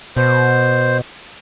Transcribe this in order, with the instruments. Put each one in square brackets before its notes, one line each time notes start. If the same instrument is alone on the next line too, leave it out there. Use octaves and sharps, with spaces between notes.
[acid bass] B2 [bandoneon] C5